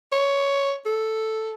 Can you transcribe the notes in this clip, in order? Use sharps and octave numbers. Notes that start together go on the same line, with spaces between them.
C#5
A4